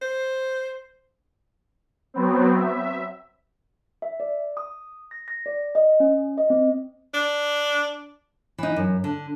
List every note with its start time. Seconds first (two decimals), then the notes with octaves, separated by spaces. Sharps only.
0.02 C5
2.14 F#3 B3 C4
2.56 E5
4.02 E5
4.20 D5
4.57 D#6
5.11 A#6
5.28 A#6
5.46 D5
5.75 D#5
6.00 C#4
6.38 D#5
6.50 C4
7.14 D4
8.58 E3 D#4
8.76 F#2
9.04 D3